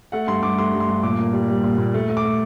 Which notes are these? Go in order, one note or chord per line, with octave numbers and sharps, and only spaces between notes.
A3 F#5
G2 C6
G2 D6
A3 C6
G2
C6
G2
A#2 D6
A#3
G3
G3
A#2
A#2
A3
A3
D6
A3